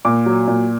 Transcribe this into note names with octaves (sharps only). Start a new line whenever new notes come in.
A#2 D6
F#3
A#2